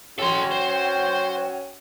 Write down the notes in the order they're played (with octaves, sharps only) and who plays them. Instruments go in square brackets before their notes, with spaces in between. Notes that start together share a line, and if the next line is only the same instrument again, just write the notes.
[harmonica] C#4 F#4 [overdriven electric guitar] A4 C6 [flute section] C#5 F#5 G5
[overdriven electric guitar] C5